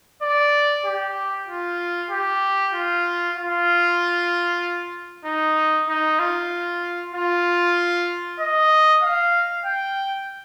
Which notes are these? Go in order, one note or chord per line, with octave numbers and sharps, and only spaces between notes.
D5
G4
F4
G4
F4
F4
D#4
D#4
F4
F4
D#5
F5
G5